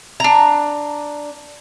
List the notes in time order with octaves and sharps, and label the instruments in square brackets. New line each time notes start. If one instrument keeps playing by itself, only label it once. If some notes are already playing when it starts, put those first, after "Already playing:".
[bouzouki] D4 A#5